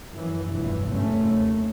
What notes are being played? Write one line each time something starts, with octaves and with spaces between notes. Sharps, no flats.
F#2 E3
F1 B1 E2 G2 E3
F#1 D2 G#2 C3 A3 C#4
D#2